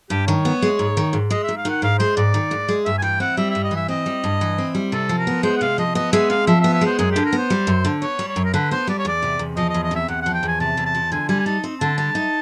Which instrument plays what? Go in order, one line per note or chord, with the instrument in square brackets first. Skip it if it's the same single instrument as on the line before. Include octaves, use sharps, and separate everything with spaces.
[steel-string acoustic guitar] G2 [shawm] G4
[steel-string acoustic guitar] D#3 [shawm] C#5
[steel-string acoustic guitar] B3
G#3
G#2
D#3
G#2
[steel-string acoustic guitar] G#3 [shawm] D#5
[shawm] E5
[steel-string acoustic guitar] G#2
[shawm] F5
[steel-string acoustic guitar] D#3 [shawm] F#5
[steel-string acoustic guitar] G#2 [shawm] F5
[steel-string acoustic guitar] G#3 [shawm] C5
[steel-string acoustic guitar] G#2 [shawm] D5
[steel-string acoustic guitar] D#3
G#2
G#3
[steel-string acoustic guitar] G2 [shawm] E5
[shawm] G#5
[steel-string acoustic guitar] E3 [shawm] G5
[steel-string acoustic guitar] C4 [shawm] F#5
[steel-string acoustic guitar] G3 [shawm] E5
[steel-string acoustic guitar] G2 [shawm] E5
[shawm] D#5
[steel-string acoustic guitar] E3
[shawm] E5
[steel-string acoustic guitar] C4 [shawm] D#5
[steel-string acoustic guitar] G3
G2
E3
C4
G3
[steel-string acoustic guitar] C3 [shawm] A4
[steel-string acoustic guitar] F3
[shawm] A#4
[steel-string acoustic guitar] B3
[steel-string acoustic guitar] G#3 [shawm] C5
[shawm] F#5
[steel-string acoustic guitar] C3 [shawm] F5
[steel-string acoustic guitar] F3 [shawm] D#5
[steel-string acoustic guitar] B3 [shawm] D#5
[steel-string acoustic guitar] G#3 [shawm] E5
[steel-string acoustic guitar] C3 [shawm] F5
[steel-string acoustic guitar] F3 [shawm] E5
[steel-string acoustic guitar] B3 [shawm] E5
[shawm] E5
[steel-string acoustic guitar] G#3
[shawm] C5
[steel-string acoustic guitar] F#2 [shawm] G#4
[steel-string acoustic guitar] D3 [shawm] G4
[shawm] A#4
[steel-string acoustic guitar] B3
[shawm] C5
[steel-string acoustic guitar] G3
F#2
D3
[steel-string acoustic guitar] B3 [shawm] C#5
[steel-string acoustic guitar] G3
[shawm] C#5
[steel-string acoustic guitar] F#2
[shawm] A#4
[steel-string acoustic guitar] D3 [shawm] B4
[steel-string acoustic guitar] B3 [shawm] C5
[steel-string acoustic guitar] G3 [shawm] D5
[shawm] C#5
[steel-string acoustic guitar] E2 [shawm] D5
[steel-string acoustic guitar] C3
E2
[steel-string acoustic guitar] F3 [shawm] D#5
[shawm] D#5
[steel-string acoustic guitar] E2
[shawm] D#5
[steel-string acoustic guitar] C3 [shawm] E5
[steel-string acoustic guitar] E2 [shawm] F#5
[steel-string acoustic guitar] F3 [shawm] F#5
[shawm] G5
[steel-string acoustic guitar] E2 [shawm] G#5
[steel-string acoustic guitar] C3 [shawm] A5
[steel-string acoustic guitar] E2
[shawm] A5
[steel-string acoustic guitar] F3
[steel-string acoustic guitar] D3 [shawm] G#5
[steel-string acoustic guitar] G3 [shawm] G#5
[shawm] G#5
[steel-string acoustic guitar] D#4 [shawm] A5
[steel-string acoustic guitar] C4
[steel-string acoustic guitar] D3 [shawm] A5
[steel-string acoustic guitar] G3 [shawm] A5
[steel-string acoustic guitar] D#4